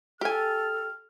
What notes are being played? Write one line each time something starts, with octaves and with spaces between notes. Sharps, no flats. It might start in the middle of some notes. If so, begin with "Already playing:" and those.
G4 A4 G#5 F6